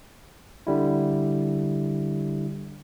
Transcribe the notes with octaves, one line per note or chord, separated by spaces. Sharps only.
D3 G3 E4